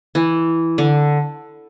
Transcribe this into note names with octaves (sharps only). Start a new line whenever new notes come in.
E3
D3